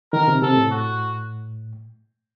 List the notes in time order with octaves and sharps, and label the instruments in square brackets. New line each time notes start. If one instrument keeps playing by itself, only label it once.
[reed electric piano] D#3 [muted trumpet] A#4
[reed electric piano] C3
[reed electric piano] C3 [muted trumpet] A4
[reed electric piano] A2
[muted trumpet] F#4